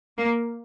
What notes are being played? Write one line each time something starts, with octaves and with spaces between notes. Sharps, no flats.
A#3